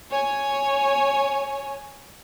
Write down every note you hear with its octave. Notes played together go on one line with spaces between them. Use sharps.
C#5 G#5